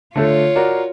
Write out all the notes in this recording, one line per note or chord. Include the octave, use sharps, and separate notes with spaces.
D3 A3 F4 A4 C#5
F#4 A#4 D5